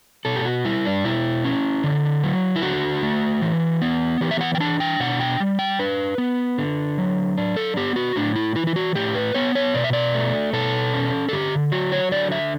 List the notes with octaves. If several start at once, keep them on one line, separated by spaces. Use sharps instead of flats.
B2 A4
G4
F#4
G3 E4
D4
B2 E4
C#4
D3
F#3
E4
D3 F#4
A3
E3
B3
E3 G4
E5
F#5
G5
D4 A5
G5
B2 F#5
G5
G3
G5
D4 B4
B3
D3
F#3
D4
A4
B3 G4
F#4
A2 D4
E4
E3 E4
E4
F#4
A2 G4
B4
B3 C#5
C#5
B2 D5
E5
D5
A3
B2 A4
C#4
A4
D3 G4
F#3 F#4
C#5
D3 D5
E5